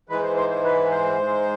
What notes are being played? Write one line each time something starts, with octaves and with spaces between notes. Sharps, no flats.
G#2 E3 G#3 B4
C5
C5
C5
B4
C5
G#2 G#3